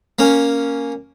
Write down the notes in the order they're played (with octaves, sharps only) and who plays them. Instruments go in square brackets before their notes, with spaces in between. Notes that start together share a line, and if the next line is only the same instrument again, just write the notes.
[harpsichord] A#3 C#4